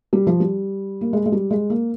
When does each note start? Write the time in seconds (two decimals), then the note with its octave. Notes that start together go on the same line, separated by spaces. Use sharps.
0.13 G3
0.27 F3
0.40 G3
1.01 A#3
1.13 G#3
1.26 G#3
1.32 G3
1.50 G#3
1.70 A#3